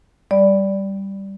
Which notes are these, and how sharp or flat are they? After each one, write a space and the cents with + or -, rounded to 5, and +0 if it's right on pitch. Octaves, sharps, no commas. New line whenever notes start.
G3 +0 D5 -10 B5 +0